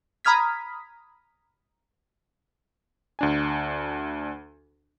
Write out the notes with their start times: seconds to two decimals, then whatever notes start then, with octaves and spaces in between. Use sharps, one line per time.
0.25 A#5 B5 D#6 F6 G#6 B6
3.19 D2 D4 G#5